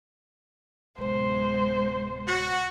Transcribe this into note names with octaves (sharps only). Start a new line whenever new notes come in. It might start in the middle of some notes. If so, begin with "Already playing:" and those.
D1 C3 G#3 B3 C5
F#4